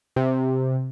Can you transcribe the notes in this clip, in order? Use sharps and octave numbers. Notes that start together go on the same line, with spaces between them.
C3